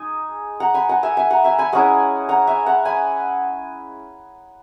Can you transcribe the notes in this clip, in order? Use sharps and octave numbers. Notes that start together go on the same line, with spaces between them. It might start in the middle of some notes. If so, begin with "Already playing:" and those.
Already playing: G#3 D#4 G#5
F#5 A#5
G#5 B5
F#5 A#5
E5 G#5
E5 G#5
F#5 A#5
E5 G#5
G#5 B5
G#3 C#4 E4 F#5 A#5
F#5 A#5
E5 G#5
F#5 A#5
G#5 B5